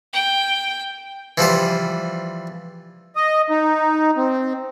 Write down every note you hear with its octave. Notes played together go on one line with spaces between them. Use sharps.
G5
E3 F3 G3 C5
D#5
D#4
C4